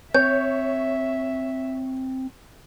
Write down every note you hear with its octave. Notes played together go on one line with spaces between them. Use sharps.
C4 C#5 E5 G6